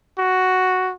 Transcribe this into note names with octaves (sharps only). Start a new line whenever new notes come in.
F#4